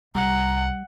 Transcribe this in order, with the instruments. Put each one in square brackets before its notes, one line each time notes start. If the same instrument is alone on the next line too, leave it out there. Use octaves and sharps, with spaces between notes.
[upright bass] C2 [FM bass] G3 [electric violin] F#5 [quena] A#5